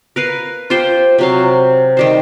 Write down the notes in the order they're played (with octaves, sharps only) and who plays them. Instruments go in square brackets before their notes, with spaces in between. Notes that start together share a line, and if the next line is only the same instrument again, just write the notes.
[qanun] A#4 B4 F5
F4 G4 C5 G5
C3 F#3 F5
D#3 G3 C5